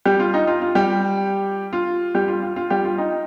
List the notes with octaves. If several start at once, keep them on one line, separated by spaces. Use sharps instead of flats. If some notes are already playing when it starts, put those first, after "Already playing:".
G3 G4
F4
D#4
F4
F4
G3 G4
F4
G3 G4
F4
F4
F4
G3 G4
F4
D#4